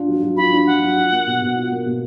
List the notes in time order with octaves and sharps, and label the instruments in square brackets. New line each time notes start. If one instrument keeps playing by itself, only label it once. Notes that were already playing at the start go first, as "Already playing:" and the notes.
Already playing: [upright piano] D4 F4
F#3
F#3
[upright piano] F4 [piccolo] B5
[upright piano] D4
[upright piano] F#3 [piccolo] F#5
[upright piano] F#3
F4
A#3
B2
B2
F4
A#3
B2